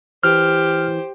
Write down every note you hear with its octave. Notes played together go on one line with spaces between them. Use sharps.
E3 G4 C5 F6